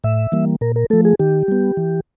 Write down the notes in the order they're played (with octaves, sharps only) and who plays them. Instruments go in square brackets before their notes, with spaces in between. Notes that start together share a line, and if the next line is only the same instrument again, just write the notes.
[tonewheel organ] A2 E5
E3 G3 A#3
A#2 A#4
A#4
F3 A3 A4
G#4
D#3 G4
G3 B3
E3